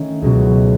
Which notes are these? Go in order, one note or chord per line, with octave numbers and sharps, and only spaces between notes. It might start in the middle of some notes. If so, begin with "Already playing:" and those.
Already playing: D#3 A3 C#4
C#2 B2 F#3 B3